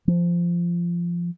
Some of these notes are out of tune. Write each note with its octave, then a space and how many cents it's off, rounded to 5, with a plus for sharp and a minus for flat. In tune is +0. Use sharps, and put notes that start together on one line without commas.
F3 -15